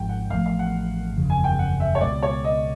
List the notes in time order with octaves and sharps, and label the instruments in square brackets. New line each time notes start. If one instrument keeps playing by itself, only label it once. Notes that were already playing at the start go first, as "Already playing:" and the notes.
Already playing: [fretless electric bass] G#1 G#2 F3 [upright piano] G5
[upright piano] F#5
[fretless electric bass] A1 A2 F3 A3 [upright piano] F5
[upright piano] F5
F#5
[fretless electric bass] F#1 E2 C#3 F3
[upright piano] G#5
G5
F#5
E5
C#5
[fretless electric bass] C#2 B2 G#3 [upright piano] D5
[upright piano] C#5
D#5